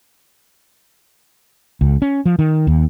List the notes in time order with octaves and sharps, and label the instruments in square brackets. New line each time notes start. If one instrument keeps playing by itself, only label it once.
[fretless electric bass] C#2
C#4
F3
D#3
D#2